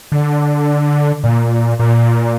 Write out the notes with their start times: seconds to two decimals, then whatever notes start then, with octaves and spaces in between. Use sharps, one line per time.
0.12 D3
1.24 A#2
1.79 A#2